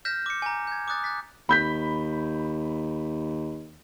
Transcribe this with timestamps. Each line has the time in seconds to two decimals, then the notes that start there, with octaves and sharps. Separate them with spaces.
0.05 F6 G6 A#6 B6 E7
0.26 D6 C#7
0.42 G#5 A#5
0.67 G6 G#6
0.88 D6 D#6 F#6 A6
1.04 F#6 A6 B6
1.49 D#2 B5 G6 B6